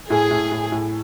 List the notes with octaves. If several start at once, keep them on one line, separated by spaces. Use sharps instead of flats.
A2 G#4
A2
A2
A2